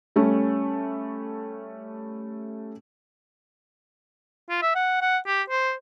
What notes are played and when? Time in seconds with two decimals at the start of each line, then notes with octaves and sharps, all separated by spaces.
0.16 G3 A3 C#4
4.50 F4
4.62 E5
4.75 F#5
5.02 F#5
5.27 G4
5.50 C5